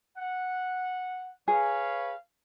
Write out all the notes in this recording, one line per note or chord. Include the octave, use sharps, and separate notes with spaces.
F#5
G#4 B4 C#5 F5